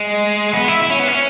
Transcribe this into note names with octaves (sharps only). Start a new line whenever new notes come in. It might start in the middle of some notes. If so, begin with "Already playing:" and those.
Already playing: G#3
B3
E4
E4
C#4
B3
C#4